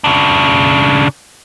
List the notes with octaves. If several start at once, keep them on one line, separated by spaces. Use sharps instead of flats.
C#3 D4